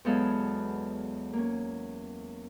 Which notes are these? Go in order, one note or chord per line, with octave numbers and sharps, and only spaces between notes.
E2 F#3 G#3 B3 A4 F5
A#3 C#4